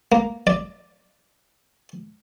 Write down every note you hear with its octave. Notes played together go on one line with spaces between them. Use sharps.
A#3
D5